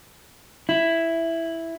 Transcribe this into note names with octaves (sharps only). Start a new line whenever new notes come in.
E4